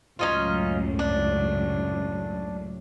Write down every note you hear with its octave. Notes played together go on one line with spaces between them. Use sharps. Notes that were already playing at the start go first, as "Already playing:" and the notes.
C#2 F#2 A2 C#4 D#4 F4
D4